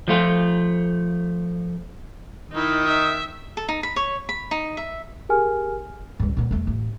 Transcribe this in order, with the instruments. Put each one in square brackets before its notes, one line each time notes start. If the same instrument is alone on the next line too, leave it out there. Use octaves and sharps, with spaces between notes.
[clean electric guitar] F3 A3 F4
[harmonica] D#3 [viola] D#4 E4
[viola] E5
[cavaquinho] A4
D#4
B5
C#5
B5
D#4
E5
[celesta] G4 G#4 A#4 G#5 F6
[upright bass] C#2 G2
A#2 B3
E2 A3
A1